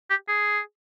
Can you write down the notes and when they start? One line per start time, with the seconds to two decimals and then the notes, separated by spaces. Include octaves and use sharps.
0.10 G4
0.28 G#4